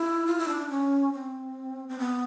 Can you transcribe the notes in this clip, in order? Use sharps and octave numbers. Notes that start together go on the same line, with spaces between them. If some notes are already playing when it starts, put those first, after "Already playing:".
Already playing: E4
F4
E4
D4
D4
C#4
C4
C4
B3